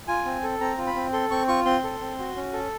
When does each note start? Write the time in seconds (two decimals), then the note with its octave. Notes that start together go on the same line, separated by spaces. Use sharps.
0.08 F4 G#5
0.26 C4
0.43 A4
0.60 C4 A#5
0.78 F4
0.87 B5
0.96 C4
1.13 A4 C6
1.31 C4 C#6
1.48 F4 C#6
1.65 C4 C6
1.84 A4
2.01 C4
2.19 F#4
2.36 C#4
2.53 A4